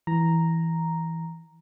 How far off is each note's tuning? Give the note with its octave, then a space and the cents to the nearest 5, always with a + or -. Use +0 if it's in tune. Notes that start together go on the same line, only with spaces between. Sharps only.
E3 +0 A#5 +0